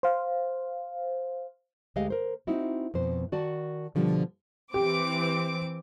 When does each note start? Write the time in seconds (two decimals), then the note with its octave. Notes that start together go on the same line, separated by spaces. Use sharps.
0.03 C5 F5
1.96 D2 G#3 A3 G4 D#5 F5
2.10 A#4 C5
2.47 C4 D#4 E4 F#4
2.94 F2 B2 C5
3.32 D#3 F#4 D5 F#5 A5
3.95 B2 D3 F3 G3
4.74 E3 C4 G4 D6